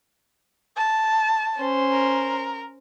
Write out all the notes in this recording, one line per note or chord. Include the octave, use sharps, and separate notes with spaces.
A5
C#4 C5
A#4